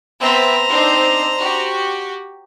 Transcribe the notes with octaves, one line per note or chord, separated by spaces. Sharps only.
B3 C4 C5 E5 A#5
C4 D4 D#4
F#4 G4